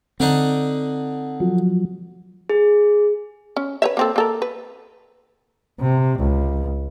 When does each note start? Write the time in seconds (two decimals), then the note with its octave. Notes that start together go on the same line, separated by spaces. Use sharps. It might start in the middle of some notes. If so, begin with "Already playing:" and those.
0.20 D3 C4 D4 D#4
1.40 F3 F#3
2.50 G#4
3.56 C#4
3.82 B4 C#5 E5
3.97 A#3 C4 A4
4.16 A#3 A4 A#4
4.42 B4
5.80 C3
6.18 C#2